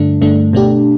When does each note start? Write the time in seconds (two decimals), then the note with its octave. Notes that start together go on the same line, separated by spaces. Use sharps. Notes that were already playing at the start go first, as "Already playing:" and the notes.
Already playing: G2 D3 A3 D4
0.21 G2 D3 A3 D4
0.53 B2 A3 D4 G4